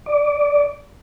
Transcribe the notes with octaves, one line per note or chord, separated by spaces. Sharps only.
D5